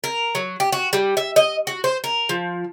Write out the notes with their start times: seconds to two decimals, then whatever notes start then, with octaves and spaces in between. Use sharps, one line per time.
0.04 A#4
0.35 F#3
0.60 G4
0.72 F#4
0.93 G3
1.17 E5
1.36 D#5
1.67 F#4
1.84 C5
2.04 A#4
2.29 F3